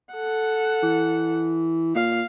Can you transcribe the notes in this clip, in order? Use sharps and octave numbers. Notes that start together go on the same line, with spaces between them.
A4 F#5
E3
A#2 F5